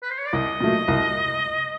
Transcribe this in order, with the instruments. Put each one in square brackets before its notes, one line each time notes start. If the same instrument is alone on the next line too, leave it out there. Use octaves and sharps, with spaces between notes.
[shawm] B4
C5
C#5
D5
[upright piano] C2 [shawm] D#5
[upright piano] A#2 F#3 A3
C2